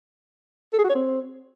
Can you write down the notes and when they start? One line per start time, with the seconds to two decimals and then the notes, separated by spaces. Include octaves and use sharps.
0.73 A4
0.79 G#4
0.84 F#4
0.90 C#5
0.95 C4